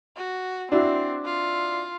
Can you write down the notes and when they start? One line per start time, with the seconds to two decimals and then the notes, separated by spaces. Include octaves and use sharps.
0.17 F#4
0.72 C4 D4 E4 F#4
1.25 F4